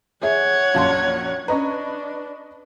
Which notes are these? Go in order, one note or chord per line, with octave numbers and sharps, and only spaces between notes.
G#4 C#5 E5 F#5
A#1 F#2 F5 A5 C6
C#4 D4 B4 D#5 A#5 C#6